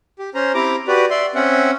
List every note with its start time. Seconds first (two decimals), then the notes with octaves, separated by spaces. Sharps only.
0.19 G4
0.35 C#4 C5 A#5
0.54 C4 E4 G4 A#5 D6
0.88 F#4 G4 B4 D5
1.10 D5 E5 C6
1.35 C4 C#4 E5 F#5